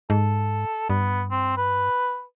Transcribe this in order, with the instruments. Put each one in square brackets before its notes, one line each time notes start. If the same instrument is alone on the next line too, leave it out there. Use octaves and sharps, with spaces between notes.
[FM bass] G#2 [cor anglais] A4
[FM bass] G2 [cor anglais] B3
[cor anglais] C4
B4